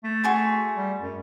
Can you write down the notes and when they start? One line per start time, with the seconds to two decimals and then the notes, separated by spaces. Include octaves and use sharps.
0.04 A3
0.24 F#4 G#4 C6
0.77 G3
1.01 F#2